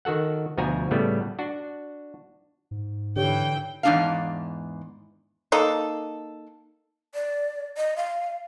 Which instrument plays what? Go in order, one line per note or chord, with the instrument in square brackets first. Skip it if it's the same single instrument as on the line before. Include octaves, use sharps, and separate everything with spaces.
[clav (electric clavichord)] D#3 F#4 A4 F#5
D2 B2 F3 F#4 G#5 A#5
A2 C#3 G3 A3 B3
D4 F#4
[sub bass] G#2
[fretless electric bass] D3 [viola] E3 G5 [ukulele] G4 C#5
[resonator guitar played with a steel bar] E2 G#2 G#3 D4 G#4 F5
[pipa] A#3 D#4 A4
[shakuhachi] D5
D#5
F5